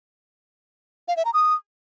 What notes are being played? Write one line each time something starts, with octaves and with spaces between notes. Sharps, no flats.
F5
E5
A#5
D#6